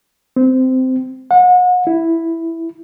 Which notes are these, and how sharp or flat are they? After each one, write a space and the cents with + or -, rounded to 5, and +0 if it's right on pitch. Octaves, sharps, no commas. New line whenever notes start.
C4 -15
F#5 -35
E4 +0